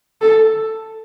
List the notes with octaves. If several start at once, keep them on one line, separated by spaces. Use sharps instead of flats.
A4